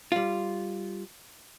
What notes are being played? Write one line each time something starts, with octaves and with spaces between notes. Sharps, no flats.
G3 F4